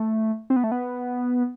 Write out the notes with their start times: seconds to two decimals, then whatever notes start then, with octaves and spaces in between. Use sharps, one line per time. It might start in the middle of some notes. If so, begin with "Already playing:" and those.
Already playing: A3
0.50 C4
0.56 B3
0.64 A3
0.72 B3